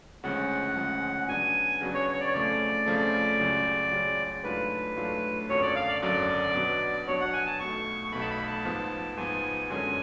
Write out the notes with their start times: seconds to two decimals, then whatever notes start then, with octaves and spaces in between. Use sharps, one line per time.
0.23 D2 C#3 F3 G#3 C#4 F#5
0.76 D2 C#3 F3 G#3 C#4
1.28 C#3 F#3 B3 D4 F#4 G#5
1.81 C#3 F#3 B3 D4 F#4
1.94 C#5
2.13 C#5
2.20 D5
2.27 C#5
2.33 F2 C#3 F3 A3 D5
2.86 F2 C#3 F3 A3
3.39 C#2 C#3 F#3
3.92 C#2 C#3 F#3
4.44 G#2 F#3 A3 D4 F4 B4
4.96 G#2 F#3 A3 D4 F4
5.49 G#1 F#2 D3 F#3 C#5
5.62 D5
5.76 F5
5.88 D5
6.02 G#1 F#2 D3 F#3 D5
6.55 B2 F#3 B3 D4 F#4
7.07 B2 F#3 B3 D4 F#4 C#5
7.21 F#5
7.33 G#5
7.47 A5
7.59 B1 B2 A3 C#6
8.04 C#6
8.12 B1 B2 A3 B5
8.21 A5
8.30 B5
8.48 A5
8.65 G#2 F3 B3
9.17 G#2 F3 B3 G#5
9.70 F#2 D3 G#3 C#4 G#5